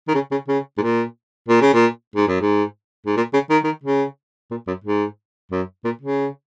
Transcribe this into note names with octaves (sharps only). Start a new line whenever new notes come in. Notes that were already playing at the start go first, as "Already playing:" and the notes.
D#3
C#3
C#3
C#3
G#2
A#2
A#2
C#3
A#2
G#2
F#2
G#2
G#2
A#2
C#3
D#3
D#3
C#3
A#2
F#2
G#2
F#2
A#2
C#3